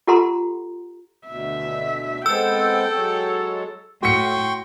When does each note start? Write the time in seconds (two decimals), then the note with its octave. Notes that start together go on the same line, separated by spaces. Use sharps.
0.07 F4 G4 A4 F#5 A#5 C6
1.28 D2 B2 E5
2.26 G#3 B3 C4 A4 G5 E6
2.95 F#3 G#3 C#5
4.03 A2 F#4 G5 C6 C#6 C#7